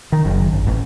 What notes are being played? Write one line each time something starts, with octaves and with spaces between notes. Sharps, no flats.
D#3
F#1
G#1
A1